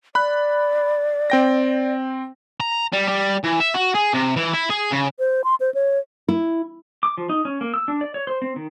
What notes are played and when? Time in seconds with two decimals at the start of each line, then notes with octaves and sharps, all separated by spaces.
0.15 D5 B5 F#6
1.30 C4 G5 A#6
2.60 A#5
2.93 G3
3.08 G3
3.44 E3
3.60 E5
3.74 F#4
3.94 G#4
4.14 C3
4.36 E3
4.54 E4
4.70 G#4
4.92 C#3
5.19 C5
5.44 C6
5.60 C5
5.74 C#5
6.28 E4
7.03 D6
7.18 F3
7.29 D#4
7.45 C#4
7.61 A#3
7.74 E6
7.88 D4
8.01 D5
8.14 C#5
8.27 C5
8.42 C4
8.56 D#3